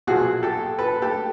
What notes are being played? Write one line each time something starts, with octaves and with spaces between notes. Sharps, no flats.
B1 A#2 F3 F#4 G#4
G4 A4
A4 B4
G4 A4